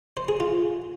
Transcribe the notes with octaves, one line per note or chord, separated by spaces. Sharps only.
C5
G#4
F4